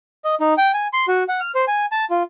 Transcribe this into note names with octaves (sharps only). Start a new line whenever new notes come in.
D#5
D#4
G5
G#5
C6
F#4
F#5
F6
C5
G#5
A5
F4